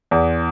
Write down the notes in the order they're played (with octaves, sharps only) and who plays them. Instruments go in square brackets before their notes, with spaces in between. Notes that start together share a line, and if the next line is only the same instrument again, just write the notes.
[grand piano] E2